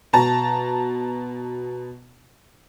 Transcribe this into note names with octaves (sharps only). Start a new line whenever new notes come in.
B2 A5 A#5